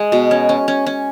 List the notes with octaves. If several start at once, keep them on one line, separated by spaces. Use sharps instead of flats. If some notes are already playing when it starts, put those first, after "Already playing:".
Already playing: G#3
B2
C#4
C#4
C#4
C#4